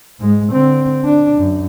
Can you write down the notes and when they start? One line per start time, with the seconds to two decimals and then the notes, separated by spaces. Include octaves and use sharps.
0.19 G#2 G#3
0.52 D3 C4
1.05 D4
1.36 F#2